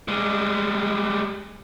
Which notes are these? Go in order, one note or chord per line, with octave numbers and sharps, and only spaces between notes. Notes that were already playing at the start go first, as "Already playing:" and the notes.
G3 G#3